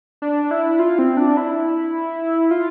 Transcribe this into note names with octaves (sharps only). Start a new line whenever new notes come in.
D4
E4
F4
C4
D4
E4
F4